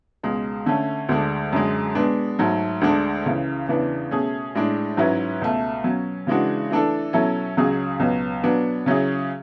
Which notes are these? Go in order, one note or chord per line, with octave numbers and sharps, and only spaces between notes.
C#2 B2 G#3
D3 A3 C#4
D2 D3 G#3 D4
F#2 D3 G#3
B2 G#3 B3 D4
G#2 F#3 A3
D2 D3 G#3 D4
C#2 C#3 E3
E2 C#3 E3 B3 D4
B2 A3 C#4 G#4
A2 G#3 D4
G#2 F#3 C#4 E4 B4
C#2 B2 A3
B2 F#3 C#4
C#3 E3 G#3 D4 F#4
E3 A3 D4 A4
B2 F#3 C#4 E4 A4
C#2 C#3 F#3 C#4 G#4
C#2 B2 F#3 B3
B2 F#3 B3 D4
C#3 F#3 C#4 E4 G#4